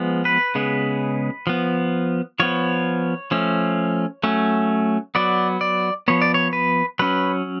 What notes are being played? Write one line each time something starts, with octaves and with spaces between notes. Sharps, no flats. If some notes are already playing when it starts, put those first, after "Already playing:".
Already playing: F3 G#3 B3
B4
C#3 G#3 B3
F3 B3
F3 B3 C#5
F3 A3 C#4
F#3 A3 C#4
F#3 B3 D5
D5
F3 B3 C#5
D5
C#5
B4
F#3 C#4 B4